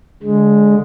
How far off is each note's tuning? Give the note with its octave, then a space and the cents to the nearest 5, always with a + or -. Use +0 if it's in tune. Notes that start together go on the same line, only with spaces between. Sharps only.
D3 -20 G#3 +0